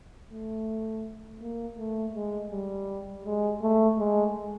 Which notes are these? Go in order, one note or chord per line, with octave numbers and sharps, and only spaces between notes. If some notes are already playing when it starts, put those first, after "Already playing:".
A3
A#3
A3
G#3
G3
G#3
A3
G#3